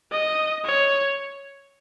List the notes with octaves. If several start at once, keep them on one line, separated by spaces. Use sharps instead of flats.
D#5
C#5